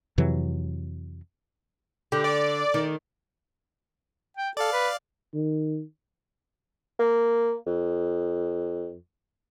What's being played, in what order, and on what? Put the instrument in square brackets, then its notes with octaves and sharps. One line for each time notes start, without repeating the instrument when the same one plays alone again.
[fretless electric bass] F2 C3 E3 F#3
[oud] D3 [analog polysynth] G4
[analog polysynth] D5
[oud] D#3
[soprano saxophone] G5
[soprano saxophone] A4 [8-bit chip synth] D5 F5
[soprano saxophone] B4
[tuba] D#3
[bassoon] A#3
F2